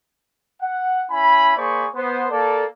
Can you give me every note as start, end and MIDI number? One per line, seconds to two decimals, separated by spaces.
0.62 1.04 78
1.11 1.53 61
1.11 1.53 64
1.11 1.53 80
1.11 1.53 83
1.57 1.87 58
1.57 1.87 68
1.57 1.87 72
1.57 1.87 74
1.57 1.87 83
1.57 1.87 85
1.95 2.25 59
1.95 2.25 72
2.31 2.65 58
2.31 2.65 69
2.31 2.65 74